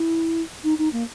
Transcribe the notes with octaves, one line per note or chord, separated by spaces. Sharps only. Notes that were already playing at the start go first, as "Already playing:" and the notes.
Already playing: E4
D#4
D#4
A#3